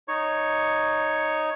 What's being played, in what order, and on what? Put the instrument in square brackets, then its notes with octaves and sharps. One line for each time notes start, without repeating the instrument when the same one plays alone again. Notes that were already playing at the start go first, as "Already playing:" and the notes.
[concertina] D#4 C#5 C#6